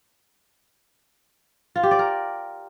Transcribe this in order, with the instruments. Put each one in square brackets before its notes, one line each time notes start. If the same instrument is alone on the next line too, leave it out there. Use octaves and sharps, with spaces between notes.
[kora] F4
G4
D5
A#4